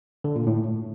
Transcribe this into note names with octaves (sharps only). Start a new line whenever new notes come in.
D3
A#2
A2